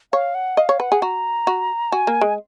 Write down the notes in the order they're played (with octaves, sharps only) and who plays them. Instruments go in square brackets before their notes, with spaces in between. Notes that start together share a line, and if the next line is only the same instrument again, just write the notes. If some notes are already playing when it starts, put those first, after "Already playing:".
[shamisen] C#5 [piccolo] F5
[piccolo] F#5
[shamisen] D#5 [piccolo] F5
[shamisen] C#5
[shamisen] B4 [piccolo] F#5
[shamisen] G#4
[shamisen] F#4 [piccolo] A#5
[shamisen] F#4
[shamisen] F#4 [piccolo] G#5
[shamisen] A#3
G#3